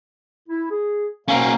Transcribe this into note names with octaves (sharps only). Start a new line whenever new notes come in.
E4
G#4
B2 A#3 C#4 C5 F5